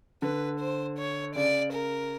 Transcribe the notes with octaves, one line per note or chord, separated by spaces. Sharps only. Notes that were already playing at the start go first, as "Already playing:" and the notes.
D3 B4
C5
C#5
C#3 D5
A#4